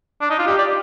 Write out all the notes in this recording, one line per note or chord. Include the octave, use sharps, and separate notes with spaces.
D4
D#4
F4
G4
D5